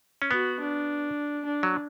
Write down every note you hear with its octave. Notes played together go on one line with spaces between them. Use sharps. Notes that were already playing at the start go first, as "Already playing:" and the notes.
C#4
B3 F#4
D4
D4
F#3